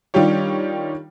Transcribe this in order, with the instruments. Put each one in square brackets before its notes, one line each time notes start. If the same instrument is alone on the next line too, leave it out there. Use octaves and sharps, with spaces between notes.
[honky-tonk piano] D#3 G3 D4 F4 G4 C#5